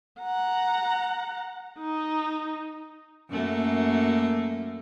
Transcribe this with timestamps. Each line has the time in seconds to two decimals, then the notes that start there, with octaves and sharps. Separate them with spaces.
0.21 F#5 A#5
1.79 D#4
3.30 F#2 A3 A#3